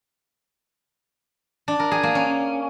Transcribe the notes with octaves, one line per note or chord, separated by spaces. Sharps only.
D4
A#4
G#4
A#3
C#4